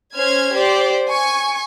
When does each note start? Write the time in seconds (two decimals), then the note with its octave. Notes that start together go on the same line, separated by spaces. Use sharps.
0.15 C#4 C5 F6 G#6
0.55 G4 C5 D5
1.08 G#5 C#6